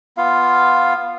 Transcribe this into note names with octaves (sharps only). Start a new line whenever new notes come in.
B3 F4 F5